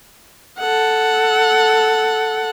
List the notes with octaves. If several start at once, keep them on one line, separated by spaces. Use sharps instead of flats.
A4 F#5